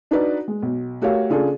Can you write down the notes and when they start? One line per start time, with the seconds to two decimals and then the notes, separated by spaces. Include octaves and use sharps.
0.11 D4 D#4 F#4 B4 D5
0.48 G#3
0.62 B1
1.01 A3 F#4 G4 A#4 C#5 F5
1.30 C#3 D4 F4 G#4 A4